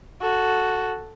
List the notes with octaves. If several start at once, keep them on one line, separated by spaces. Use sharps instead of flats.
F#4 A4